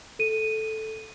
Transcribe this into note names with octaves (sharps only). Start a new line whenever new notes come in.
A4 D#7